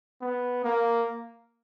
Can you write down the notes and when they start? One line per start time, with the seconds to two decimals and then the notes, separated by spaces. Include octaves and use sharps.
0.21 B3
0.64 A#3